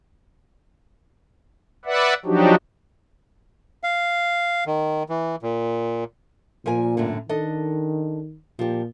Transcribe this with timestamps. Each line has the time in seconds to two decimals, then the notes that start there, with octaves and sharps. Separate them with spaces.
1.85 B4 D5 E5 F#5
2.25 F3 F#3 D4 D#4 F#4 G4
3.83 F5
4.66 D#3
5.09 E3
5.42 A#2
6.66 A#2 F3 A#4 G#5
6.97 F#2 A2 D3
7.29 D#3 D4 A4 D#5
8.59 A#2 F3 G4